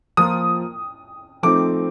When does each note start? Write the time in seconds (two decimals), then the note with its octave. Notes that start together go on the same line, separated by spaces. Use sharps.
0.17 F3 A#3 F4 A#4 D#6
1.43 F3 A3 C4 D#4 D6